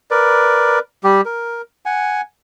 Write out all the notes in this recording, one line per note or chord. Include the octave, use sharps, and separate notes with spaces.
A#4 B4 D5
G3 G4
A#4
F#5 G#5